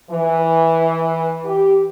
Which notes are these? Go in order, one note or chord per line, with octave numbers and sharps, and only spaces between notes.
E3
G4